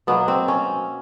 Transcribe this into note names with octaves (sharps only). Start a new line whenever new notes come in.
B2 F#3 A#3 B3
C4
C#4